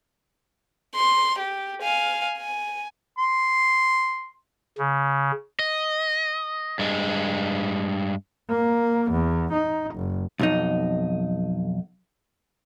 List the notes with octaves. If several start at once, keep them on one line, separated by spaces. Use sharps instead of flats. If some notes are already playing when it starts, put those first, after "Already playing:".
C6
G4
F5 G#5
G#5
C6
C#3
D#5
G2 G#3
A#3
E2
D#4
F#1
B1 F2 D#4